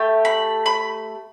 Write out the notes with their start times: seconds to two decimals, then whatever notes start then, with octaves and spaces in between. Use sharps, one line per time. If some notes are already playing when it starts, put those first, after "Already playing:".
Already playing: A3 G4
0.25 B5
0.66 B5